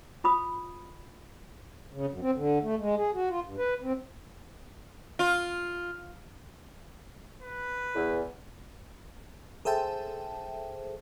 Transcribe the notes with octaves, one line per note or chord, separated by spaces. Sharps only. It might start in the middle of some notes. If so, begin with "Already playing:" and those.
F4 B5 D#6
C#3
F#2
C4
D3
A3
G#3
G#4
F#4
F4
G2
B4
C4
F4
B4
E2
G#4 A4 C5 E5 G5 A5